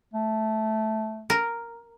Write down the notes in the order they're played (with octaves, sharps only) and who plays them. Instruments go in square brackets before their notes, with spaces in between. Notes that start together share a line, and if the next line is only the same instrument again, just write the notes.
[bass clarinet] A3
[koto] A#4